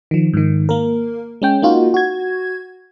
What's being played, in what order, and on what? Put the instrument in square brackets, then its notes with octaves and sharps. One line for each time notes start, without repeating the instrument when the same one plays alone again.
[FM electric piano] D#3 F3
G#2 D#3
A#3 A#4
G#3 C#4 G5
A#3 D#4 F4 F#4
F#4 G#6